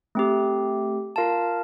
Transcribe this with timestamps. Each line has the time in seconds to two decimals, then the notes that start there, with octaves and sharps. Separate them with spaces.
0.15 A3 C4 G4
1.16 F4 A#4 F5 A5